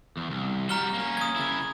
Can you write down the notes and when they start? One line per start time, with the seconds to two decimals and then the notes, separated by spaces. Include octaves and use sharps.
0.17 E2
0.30 C2
0.69 G3 F#4 A#5 F6 G7
0.94 A#3 C#4
1.17 D#6 G#6
1.36 C#3 E4